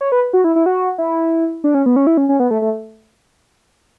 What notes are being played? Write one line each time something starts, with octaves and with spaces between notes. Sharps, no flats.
C#5
B4
F#4
E4
E4
F#4
E4
D4
C#4
B3
C#4
E4
C#4
C#4
B3
A3
A3